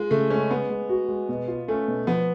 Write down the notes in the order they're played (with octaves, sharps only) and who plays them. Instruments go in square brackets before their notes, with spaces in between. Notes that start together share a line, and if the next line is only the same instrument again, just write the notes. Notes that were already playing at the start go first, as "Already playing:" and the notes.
Already playing: [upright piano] G#3 [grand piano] F4
[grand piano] C#3 [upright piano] A3
[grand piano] G#3 [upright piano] C#4
[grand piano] G#3 [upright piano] B3
[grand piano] G#3
F#4
G#3
B2
F4
[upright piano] A3 [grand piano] C#4
[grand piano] B2
[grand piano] F3 [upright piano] B3